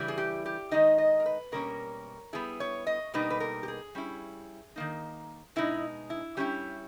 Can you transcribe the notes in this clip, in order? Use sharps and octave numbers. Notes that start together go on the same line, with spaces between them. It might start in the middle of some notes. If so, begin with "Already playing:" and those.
Already playing: C#3 E3 G3 E4
G#4
G4
G4
D#3 G#3 D#4 D#5
D#5
A#4
B4
B2 G3 A#3 C#4 A#4
G3 B3 E4 G#4
C#5
D#5
B2 G3 A#3 D#4 B4
B4
A#4
G4
G#4
G3 C#4 E4
D#3 A#3 D#4
B2 G#3 D#4 E4
E4
G3 C#4 E4 G4